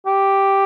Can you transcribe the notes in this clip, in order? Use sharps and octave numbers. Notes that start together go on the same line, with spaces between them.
G4